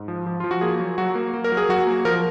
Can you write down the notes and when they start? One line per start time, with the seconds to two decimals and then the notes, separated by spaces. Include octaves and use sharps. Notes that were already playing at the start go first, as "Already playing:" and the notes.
Already playing: G#2
0.08 F3
0.26 F3
0.40 F3 F4
0.51 F#4
0.61 A#3 G#4
0.80 F#3
0.98 F#3 F#4
1.15 A#3
1.34 A#3
1.44 A#4
1.52 F#3
1.57 G#4
1.69 F#3 F#4
1.87 A#3
2.05 F3 A#4